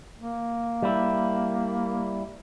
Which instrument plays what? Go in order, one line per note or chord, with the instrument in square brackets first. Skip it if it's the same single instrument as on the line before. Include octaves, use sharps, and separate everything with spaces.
[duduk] A#3
[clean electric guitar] G3 E4